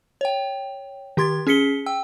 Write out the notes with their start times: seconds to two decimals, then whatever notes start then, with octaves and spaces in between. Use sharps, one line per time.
0.21 C#5 G5
1.17 D#3 G4 C6 G#6 A6
1.47 C#4 G#4 B6 C#7 G7
1.86 G5 E6